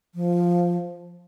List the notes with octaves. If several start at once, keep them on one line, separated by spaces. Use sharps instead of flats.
F3